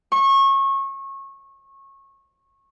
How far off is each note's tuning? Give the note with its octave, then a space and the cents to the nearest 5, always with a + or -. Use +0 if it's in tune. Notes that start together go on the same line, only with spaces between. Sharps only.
C#6 -25